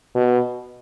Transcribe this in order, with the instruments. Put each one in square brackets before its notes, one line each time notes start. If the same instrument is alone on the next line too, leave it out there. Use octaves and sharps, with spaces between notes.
[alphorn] B2